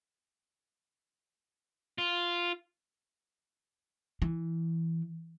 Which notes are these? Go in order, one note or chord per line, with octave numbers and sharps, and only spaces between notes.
F4
E3